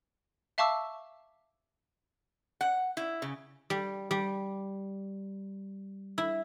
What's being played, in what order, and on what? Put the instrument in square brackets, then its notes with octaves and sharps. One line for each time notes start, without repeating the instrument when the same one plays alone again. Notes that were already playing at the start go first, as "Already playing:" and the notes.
[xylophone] E5 F5 A5 C#6 D6 E6
[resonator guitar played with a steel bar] F#5
E4
C#3
[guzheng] G3
G3
E4